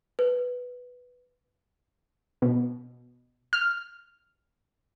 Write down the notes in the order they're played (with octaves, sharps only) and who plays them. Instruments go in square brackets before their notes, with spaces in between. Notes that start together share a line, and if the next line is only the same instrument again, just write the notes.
[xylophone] B4
[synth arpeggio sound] B2
F6